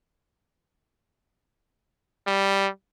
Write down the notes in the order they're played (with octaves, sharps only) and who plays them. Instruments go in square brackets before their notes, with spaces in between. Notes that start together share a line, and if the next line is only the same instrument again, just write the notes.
[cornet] G3